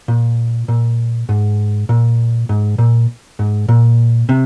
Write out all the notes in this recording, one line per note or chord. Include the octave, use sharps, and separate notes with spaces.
A#2
A#2
G#2
A#2
G#2
A#2
G#2
A#2
C3